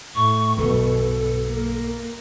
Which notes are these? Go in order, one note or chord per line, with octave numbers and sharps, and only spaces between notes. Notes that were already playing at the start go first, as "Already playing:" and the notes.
A2 C#6
B1 G2 B2 F#3 A4
A#3